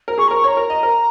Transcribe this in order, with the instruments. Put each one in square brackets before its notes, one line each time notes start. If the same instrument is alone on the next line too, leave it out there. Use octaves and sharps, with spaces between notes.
[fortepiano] A#4
[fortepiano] G#4 [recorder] C#6
[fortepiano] A#4 [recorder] A#5
[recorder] C#6
[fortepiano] C#5 [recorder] A#5
[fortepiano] A#4
D#5
A#4